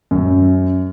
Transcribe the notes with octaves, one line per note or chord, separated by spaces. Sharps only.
F#2